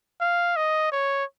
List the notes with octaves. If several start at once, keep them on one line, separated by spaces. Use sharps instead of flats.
F5
D#5
C#5